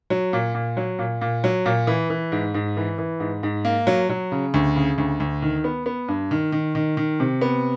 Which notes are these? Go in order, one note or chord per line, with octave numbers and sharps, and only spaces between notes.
F#3
A#2
A#2
F#3
A#2
A#2
F#3
A#2
E3
E3
G#2
G#2
E3
E3
G#2
G#2
A#3
F#3
F#3
C#3
D2
C#3
D2
D2
D#3
B3
B3
G2
D#3
D#3
D#3
D#3
C3
B3